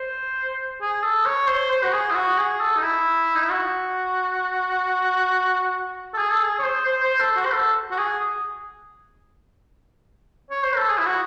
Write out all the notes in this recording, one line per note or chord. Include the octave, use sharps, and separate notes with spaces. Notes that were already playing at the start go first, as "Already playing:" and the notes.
Already playing: C5
G#4
A4
C#5
C5
C5
F#4
G#4
E4
F#4
G#4
A4
D#4
E4
D#4
E4
F#4
A4
G#4
A4
G#4
C#5
C5
C5
C5
A4
F#4
C5
A4
F#4
G#4
C#5
C5
A4
G#4
E4
F#4